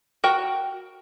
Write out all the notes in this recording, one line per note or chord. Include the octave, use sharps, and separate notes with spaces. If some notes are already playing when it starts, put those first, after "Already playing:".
F#4 A#4 G5